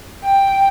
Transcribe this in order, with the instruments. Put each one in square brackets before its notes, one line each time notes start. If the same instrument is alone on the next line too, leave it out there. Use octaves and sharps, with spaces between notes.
[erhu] G5